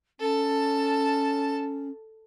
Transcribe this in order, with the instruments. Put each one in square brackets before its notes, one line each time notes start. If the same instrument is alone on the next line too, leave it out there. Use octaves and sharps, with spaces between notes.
[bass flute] C#4 [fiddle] A4 A5